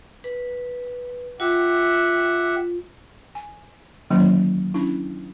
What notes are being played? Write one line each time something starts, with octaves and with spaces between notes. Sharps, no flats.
B4
F4 G4 E5 F#5
G#5
D3 D#3 F#3 A#3 C#4 E4
C#4 D4 E4